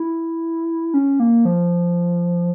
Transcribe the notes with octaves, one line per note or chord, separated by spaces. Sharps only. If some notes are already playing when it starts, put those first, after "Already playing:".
Already playing: E4
C#4
A#3
F3